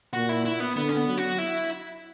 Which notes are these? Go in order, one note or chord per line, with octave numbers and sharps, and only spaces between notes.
A#2 F#4
E4
E4
B3
D3 B3
C#4
B3
F#3
F#4
E4